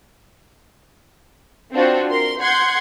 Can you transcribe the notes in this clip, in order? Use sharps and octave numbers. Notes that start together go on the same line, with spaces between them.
C4 D4 F4 F#4 C5
A#4 C6
F#5 C6 G6 G#6